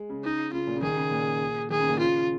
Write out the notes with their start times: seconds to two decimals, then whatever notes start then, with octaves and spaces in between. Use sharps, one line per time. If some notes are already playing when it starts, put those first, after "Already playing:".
Already playing: G#3
0.10 C#3
0.23 D#4
0.52 C#3 F4
0.67 A#2
0.76 C#3
0.82 D#3 G#4
0.96 C#3
1.11 A#2
1.70 D#3 G#4
1.80 C#3
1.89 A#2
1.98 C#3 F4